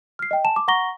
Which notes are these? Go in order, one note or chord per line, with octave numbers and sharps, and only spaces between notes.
F6 C7
D#5 G5
G#5 A5 E7
D6
F#5 A#5 C#6 A#6 G7